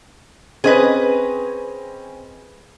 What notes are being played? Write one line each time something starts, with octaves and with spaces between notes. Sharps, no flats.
C4 C#4 G#4 B4 D#5